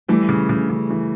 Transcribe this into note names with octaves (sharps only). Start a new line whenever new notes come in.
E3 G3 A3
C#3
C#3
C#3
E3